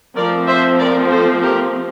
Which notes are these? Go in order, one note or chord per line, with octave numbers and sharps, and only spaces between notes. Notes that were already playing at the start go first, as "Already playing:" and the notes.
F3 A3 C4 A#4 D5
C5 E5
A#4 D5
A4 C5
G4 A#4